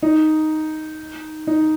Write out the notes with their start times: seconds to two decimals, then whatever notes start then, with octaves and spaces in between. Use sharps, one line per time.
0.02 D#4
1.47 D#4